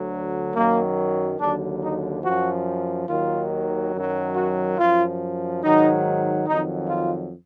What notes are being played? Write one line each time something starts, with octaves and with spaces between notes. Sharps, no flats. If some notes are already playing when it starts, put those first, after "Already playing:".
Already playing: D2 D3 F#3
F#2 D#3 F#3 A#3
D#2 D3 F#3 D4
D#4
F#2 F3 F#4
D#2 D#3 F#3 F4
F#2 D#3 F#3
F#4
F#2 F3 F4
G#2 D#3 F#3 D#4
F2 D#3 F#3 D#4
F4